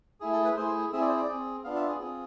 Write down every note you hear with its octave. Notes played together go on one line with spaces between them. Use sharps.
A3 E4 G#4
A4
B4
A3 E4 G#4 C5
C4 E4 G#4 E5
D5
C5
D5
C4 G#4
B3 D4 F4 F5
E5
G#4
C4 F4 G#4